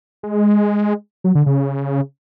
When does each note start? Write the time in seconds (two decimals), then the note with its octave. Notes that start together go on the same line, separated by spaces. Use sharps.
0.23 G#3
1.24 F#3
1.35 D3
1.46 C#3